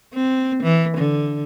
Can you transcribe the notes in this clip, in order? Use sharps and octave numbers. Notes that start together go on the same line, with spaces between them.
C4
E3
D3